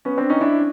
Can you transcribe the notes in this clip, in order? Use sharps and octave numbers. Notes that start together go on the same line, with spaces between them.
B3 C#4
C4 D4
C#4 D#4
D4 E4